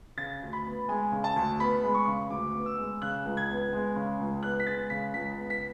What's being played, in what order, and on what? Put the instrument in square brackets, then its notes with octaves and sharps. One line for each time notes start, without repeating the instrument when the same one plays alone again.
[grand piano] C#3 A6
D2
B5
B3
G#3 G#5
C#3
A5
D2
B3 B5
G#3
C#6
C#3
D2 D6
B3
E6
G#3
C#3 F#6
C#2
G#6
B3
G#3
C#3
C#2
B3 F#6
B6
G#3 A6
C#3 B6
C#2 B6
B3
B6